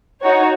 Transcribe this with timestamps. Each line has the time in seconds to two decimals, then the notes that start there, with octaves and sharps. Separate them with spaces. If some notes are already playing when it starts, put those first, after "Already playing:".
0.22 D#4 F#4 C#5